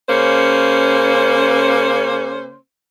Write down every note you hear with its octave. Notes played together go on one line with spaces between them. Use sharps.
C#3 A#3 C#4 C5